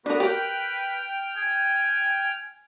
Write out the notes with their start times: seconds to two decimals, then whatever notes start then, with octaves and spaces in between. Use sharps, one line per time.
0.06 D3 B3 D4 F#4 A#4 B4
0.20 G4 A#4 G5 F6
1.37 G#5